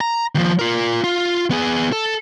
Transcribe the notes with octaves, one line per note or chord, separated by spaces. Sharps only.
A#5
D#2 F3
F4 A#4
F4
B3 G#4
A4